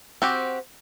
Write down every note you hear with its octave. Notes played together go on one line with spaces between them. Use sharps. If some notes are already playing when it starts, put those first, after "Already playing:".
C4 F#4 G4